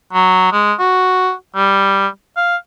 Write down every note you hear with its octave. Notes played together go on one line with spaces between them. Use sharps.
F#3
G#3
F#4
G3
F5